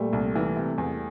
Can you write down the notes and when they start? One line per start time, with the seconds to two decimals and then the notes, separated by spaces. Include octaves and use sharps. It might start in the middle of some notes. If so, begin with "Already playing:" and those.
Already playing: A#2 G3 A3 A#3
0.13 C2
0.36 E3
0.57 C3
0.78 E2